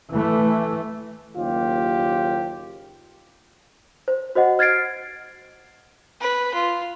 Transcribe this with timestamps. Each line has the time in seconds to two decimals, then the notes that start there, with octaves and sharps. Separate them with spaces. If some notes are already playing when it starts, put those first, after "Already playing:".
0.12 E3 A3
1.36 F#1 D#2 F4 G4
4.08 C5
4.35 F#4 C5 D#5 F#5
4.59 F6 G#6 A6 C7 D7
6.21 B4
6.54 F4